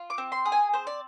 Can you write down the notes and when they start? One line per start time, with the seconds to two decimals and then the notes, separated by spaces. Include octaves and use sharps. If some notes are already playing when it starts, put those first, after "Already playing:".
Already playing: F4
0.10 D6
0.18 C4
0.32 C6
0.45 G#4
0.52 G#5
0.73 C4 C5
0.87 D5